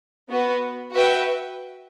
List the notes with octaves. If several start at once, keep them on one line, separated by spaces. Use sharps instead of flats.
B3 F#4 B4
F#4 B4 E5 G5